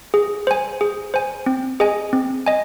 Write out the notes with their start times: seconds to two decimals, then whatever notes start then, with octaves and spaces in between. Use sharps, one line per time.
0.14 G#4
0.47 C5 G#5
0.81 G#4
1.14 C5 G#5
1.46 C4
1.80 G#4 D#5 G#5
2.13 C4
2.46 D#5 G#5